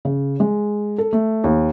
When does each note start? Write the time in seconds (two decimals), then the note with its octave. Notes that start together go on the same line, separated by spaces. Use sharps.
0.05 C#3
0.40 G#3
0.98 A4
1.13 A3
1.44 D#2